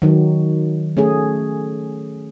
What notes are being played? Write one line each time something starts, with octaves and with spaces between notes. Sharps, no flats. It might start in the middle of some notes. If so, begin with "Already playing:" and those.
D#3 F#3
A3 C#4 G#4